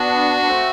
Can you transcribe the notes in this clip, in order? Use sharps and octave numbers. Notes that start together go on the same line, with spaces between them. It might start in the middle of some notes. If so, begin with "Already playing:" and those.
Already playing: B3 D4 F#4
B3
A3 C4